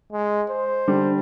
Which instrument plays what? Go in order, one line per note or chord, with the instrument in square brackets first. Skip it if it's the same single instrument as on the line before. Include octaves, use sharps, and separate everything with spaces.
[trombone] G#3
C5
[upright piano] D3 G3